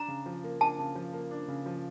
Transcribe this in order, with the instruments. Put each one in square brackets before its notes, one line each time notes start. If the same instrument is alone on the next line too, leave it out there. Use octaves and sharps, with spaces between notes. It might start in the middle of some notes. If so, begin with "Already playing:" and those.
Already playing: [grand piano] D4 [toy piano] A#5
[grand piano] C#3
F3
A#3
[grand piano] D4 [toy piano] A5
[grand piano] C#3
F3
A#3
D4
C#3
F3